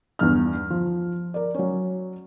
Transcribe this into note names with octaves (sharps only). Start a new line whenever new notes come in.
E2 G2 F6
F3
A#4 D5
F#3 C#4